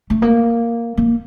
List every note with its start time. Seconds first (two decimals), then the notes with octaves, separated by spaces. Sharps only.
0.10 A3
0.22 A#3
0.97 A#3